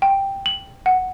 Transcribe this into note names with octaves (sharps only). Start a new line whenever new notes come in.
G5
F#7
F#5